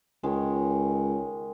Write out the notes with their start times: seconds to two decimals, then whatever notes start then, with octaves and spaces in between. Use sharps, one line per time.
0.23 C#2 D#3 G#3